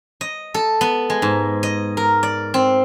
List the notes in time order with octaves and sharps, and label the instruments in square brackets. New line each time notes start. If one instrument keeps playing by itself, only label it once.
[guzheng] D#5
A4
B3
G#3
G#2
D#5
A#4
D5
C4